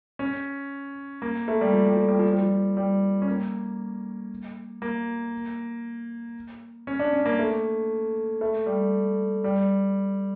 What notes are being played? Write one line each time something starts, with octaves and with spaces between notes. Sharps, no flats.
C#4
A#3
A3
G3
F3
G3
F3
G3
F3
G3
F3
G3
C#4
A#3
A#3
C#4
D4
C#4
A#3
A3
A3
G3
G3